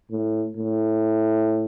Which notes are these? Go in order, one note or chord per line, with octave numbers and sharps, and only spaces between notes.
A2
A2